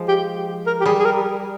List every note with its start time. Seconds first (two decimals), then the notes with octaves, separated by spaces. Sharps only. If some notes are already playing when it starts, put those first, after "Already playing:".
Already playing: F3 G#3
0.08 G4
0.67 A#4
0.81 G4
0.86 G3 G#4
0.99 G#4
1.05 A#4